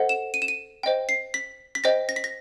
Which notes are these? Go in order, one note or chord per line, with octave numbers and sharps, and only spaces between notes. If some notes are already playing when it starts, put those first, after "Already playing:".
Already playing: A4 C5 D#5 F#5
E7
D#7
E7
D#7
C5 D#5 G5
C7
B6
B6
C5 D#5 G5 A#6
A#6
B6
A#6